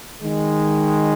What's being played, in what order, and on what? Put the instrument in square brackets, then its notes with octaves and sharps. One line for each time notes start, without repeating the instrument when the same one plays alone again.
[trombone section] D#3 G#3